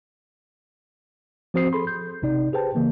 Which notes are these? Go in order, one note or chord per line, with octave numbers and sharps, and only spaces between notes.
F3 C4 F#4 C5 D#6 C7
G#4 A4 B5 C6
G6
A1 C3 D#4 D5
G4 G#4 B4 C5 G5 A5
C#3 E3 A#3